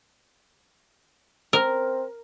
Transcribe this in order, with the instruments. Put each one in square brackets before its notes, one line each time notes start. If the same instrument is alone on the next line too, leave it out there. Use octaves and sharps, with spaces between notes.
[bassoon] C4 [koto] A#4